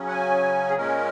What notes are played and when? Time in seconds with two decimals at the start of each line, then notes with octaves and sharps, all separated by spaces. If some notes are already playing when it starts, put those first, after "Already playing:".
Already playing: C#3 F#3 C#4
0.08 F#5
0.11 G#5
0.70 G#4
0.77 A#2 G#3 C#4 A#4